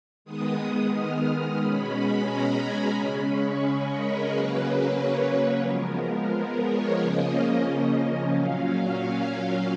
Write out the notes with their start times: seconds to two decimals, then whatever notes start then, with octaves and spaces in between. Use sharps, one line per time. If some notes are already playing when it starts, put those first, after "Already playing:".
0.25 D#3 G#3 B3 D#6
0.93 F6
1.26 D#6
1.60 B2 G#3 C#4 B5
2.27 A#5
2.61 G#5
2.95 C#3 G#3 C#4 B5
3.29 C#6
3.63 D#5
3.95 A#4
4.29 C#3 F#3 A#3 C#4 B4
4.97 C#5
5.31 B4
5.64 F3 G#3 B3 A#4
6.32 A#4
6.65 C#5
6.99 C#3 F3 A#3 C#4 D#5
8.33 A#2 F#3 C#4 F5